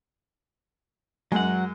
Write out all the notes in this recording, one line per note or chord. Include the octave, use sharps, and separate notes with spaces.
F#2 F#3 G#3 F#5